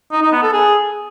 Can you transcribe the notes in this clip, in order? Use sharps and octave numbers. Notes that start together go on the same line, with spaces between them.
D#4
D#4
B3
A4
G#4